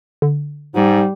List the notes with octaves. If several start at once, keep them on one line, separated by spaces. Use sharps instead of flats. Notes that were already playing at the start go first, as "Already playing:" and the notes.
D3
G#2 G3